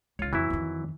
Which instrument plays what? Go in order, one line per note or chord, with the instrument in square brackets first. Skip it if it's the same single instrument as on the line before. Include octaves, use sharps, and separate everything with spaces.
[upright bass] C#2 D#3 [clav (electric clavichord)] F4 C#5
[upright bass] F2 [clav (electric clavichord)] E3 F#3 E4
[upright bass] F2 D#3